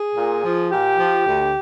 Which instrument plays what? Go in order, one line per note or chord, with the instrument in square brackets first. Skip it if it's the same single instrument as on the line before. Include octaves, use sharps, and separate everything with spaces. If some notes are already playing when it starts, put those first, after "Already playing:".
Already playing: [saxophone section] G#4
A#2
F3
A#2 G4
F3
D2